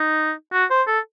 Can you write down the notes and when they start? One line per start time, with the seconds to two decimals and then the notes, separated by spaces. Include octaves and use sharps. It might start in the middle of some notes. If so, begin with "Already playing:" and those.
Already playing: D#4
0.53 F#4
0.70 C5
0.87 A4